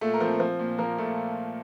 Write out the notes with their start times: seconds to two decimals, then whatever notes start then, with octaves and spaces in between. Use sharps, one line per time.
0.01 A#2 A3 A4
0.14 A#4
0.20 F3 C4 C5
0.40 F3
0.59 A#2
0.78 F3 A#3 A#4
0.98 A#2 A3 A4